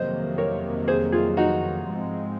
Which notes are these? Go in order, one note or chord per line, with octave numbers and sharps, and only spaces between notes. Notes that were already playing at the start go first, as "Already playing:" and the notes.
Already playing: F2 C3 D#3 F#3 A#3 C5 D#5
A#4 C#5
G#4 C5
F4 G#4
D#4 F#4
G#2 F3 G#3 C4